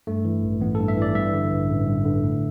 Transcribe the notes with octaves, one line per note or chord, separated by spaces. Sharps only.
G2 A3
E3
A1
A1 B3
A4
G2
E5
E3 D5
G2 E5
D3
A1
A1
G2
D3
A2